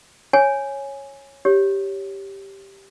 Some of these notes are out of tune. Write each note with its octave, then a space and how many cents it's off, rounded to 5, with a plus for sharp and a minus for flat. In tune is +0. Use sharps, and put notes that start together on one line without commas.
C#5 -10 G#5 +0
G4 +0 C#5 +0